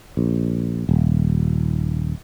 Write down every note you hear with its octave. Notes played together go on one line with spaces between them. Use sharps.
A#1
D#1